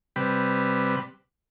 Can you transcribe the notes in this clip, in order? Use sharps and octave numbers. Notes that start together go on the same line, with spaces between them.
C3 G3 B4